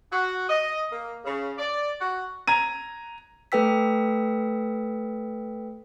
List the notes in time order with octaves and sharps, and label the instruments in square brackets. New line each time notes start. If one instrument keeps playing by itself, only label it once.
[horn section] F#4
D#5
A#3
C#3
D5
F#4
[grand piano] A#5 G#6 D#7
[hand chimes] A3 A4 B4 G5 E6 B6